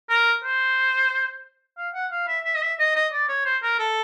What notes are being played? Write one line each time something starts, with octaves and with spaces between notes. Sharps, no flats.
A#4
C5
F5
F#5
F5
E5
E5
D#5
E5
D#5
D#5
D5
C#5
C5
A#4
A4